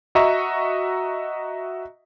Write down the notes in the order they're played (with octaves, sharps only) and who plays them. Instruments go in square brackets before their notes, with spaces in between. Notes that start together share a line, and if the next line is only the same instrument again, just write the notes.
[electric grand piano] F#4 D#5 E5 A#5 C#6